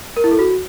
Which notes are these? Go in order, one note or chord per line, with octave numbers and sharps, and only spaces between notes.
A#4
E4
A4
F#4